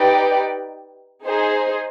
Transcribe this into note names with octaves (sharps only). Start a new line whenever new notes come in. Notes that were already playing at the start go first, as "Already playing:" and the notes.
Already playing: D#4 G4 B4 D5 G5
D#4 G#4 C5